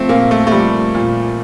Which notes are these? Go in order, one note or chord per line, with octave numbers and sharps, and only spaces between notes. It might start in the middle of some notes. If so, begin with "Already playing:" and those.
Already playing: F3 A3 C4
A#2 A#3
A3
A3
F3 G3
A#2